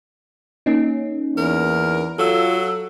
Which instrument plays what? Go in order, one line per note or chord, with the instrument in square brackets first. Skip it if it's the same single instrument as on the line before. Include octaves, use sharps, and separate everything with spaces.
[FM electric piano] A#3 C#4 D#4
[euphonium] E2 [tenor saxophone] A#4
[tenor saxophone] F#3 [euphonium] F4 [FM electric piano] A4 E6